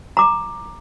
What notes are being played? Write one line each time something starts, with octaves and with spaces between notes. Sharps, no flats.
A#5 D6